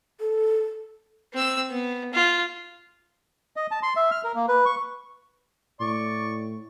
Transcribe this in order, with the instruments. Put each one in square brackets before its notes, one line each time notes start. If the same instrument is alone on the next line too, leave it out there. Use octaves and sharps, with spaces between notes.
[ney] A4
[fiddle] C4 E6
B3
F4
[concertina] D#5
A5
C6
E5
F6
A#4
A#3
B4
C#6
[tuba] A2 [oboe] D5 [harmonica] C#6